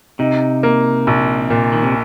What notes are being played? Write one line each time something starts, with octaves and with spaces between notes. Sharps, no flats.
C3 D#4
A#3
A#1
A#2
D#3
C3